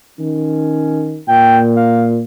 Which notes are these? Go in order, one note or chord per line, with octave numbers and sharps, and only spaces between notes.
D#3 C#4
A#2 G5
F5